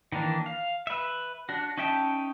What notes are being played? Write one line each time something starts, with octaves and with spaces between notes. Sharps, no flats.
D#3 E3 A#3 D4
F5
B4 E5
D4 F#4
C#4 D#4 E5 G5 A5